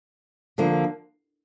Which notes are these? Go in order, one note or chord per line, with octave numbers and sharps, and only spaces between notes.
D3 F3 A#3